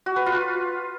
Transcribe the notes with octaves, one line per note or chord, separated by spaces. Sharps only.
F#4
B4
F4